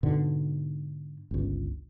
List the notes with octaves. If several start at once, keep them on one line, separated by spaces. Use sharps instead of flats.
G#2 B2 D3
G1 C#2